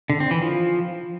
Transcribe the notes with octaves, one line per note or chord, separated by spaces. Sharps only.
D3
C4
E3
F3